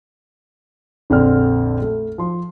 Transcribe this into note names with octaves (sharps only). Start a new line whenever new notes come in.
A#1 F2 D3 C4 D5 F6
A3
F3 C6